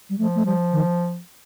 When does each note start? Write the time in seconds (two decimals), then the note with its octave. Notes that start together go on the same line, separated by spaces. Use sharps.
0.10 G3
0.18 F3 A3
0.35 A3
0.45 F3 G3
0.72 D#3